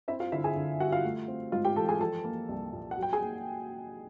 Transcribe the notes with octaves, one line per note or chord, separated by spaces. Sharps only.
C4 E4 E5
F4 F5
D3 E4 E5
G#4 G#5
D3
G3 F#4 F#5
F4 F5
A3
C4
G#2 F4 F5
G4 G5
E3 A4 A5
G#4 G#5
F3 A4 A5
A#3
C2
A#2
F#5
F#3
G5
G#4 G#5
A#3